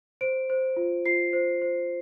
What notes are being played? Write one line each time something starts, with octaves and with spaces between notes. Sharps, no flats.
C5 D7
C5
F4
F4 C7
C5
C5